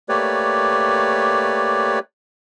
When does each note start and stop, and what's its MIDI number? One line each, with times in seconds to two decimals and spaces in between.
0.09 1.99 57
0.09 1.99 58
0.09 1.99 67
0.09 1.99 71
0.09 1.99 73
0.09 1.99 74